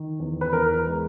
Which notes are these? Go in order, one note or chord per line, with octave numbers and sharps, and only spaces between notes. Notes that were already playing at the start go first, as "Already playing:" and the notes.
Already playing: D#3
E2
B4
E2 A#4
G#3